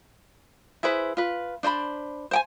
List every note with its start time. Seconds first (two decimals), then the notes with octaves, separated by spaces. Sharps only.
0.83 E4 G#4 B4 C5
1.17 F4 B4
1.63 D4 C5 D#5 B5
2.31 C5 G5 G#5